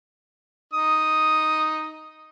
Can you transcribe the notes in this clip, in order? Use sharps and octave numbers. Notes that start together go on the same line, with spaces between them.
D#4 D#6